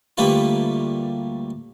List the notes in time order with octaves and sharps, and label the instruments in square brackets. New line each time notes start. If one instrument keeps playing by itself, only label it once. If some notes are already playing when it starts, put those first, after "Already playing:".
[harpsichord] D2 G3 A3 A#3 F4 B4